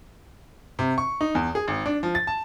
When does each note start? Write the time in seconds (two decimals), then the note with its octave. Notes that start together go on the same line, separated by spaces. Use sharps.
0.79 C3
0.98 C#6
1.21 D#4
1.35 E2
1.55 G#4
1.68 G#1
1.86 D4
2.03 F3
2.15 A6
2.27 A5